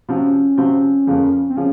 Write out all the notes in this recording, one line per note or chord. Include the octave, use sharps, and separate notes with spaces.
C3 F3 C4 C#4 F#4
C3 F3 C4 F#4
F2 C#3 F3 A#3
C4
C#3 F3 C#4